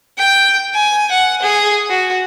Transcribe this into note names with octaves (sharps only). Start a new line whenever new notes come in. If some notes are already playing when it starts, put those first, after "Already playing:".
G5
G#5
F#5
G#4
F#4